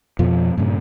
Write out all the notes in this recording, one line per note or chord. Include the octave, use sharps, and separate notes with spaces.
F2 B2 F3
G2 A#2 C#3